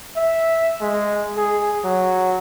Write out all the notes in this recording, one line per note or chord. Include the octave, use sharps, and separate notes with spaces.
E5
G#3
G#4
F#3